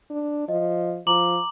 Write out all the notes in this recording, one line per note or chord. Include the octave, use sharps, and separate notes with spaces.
D4
F3 D#5
F3 A#5 D6 F#7